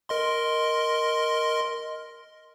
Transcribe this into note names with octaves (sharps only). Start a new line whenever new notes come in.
A#4 D#5 C6